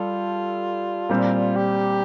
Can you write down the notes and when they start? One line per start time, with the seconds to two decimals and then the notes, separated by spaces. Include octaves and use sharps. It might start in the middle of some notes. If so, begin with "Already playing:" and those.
Already playing: G3 F4 A4
1.09 A#2 G3 C4
1.56 G4